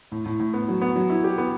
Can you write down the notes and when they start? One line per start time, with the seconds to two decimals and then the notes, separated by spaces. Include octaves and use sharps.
0.12 A2
0.26 A2
0.40 A2
0.54 B3
0.68 F#3
0.82 B3
0.96 F#3
1.10 E4
1.24 G4
1.38 B3